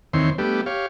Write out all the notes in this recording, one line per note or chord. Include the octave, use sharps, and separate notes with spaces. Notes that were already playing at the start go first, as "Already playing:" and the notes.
D#2 D#3 E3 C4 C#5 C6
G3 A3 B3 D4 G4
G4 C#5 F5